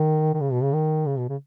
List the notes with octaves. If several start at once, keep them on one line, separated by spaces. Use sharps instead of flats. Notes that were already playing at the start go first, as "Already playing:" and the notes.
Already playing: D#3
D#3
C#3
B2
C#3
D#3
C#3
B2
C#3